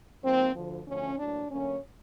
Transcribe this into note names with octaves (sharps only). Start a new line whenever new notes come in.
G#2 F3 A#3 C4
D2 D3 F3
D2 D3 F3 A3 C#4
A2 F#3 A#3 D4
D2 D3 F#3 A#3 C#4